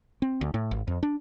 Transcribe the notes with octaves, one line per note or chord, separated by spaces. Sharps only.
C4
D2
A2
G#1
F2
D4